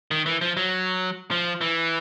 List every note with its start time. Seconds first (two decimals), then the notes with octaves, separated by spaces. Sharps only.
0.11 D#3
0.26 E3
0.41 F3
0.57 F#3
1.31 F3
1.61 E3